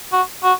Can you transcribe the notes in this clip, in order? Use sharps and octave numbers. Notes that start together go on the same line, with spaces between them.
F#4
F#4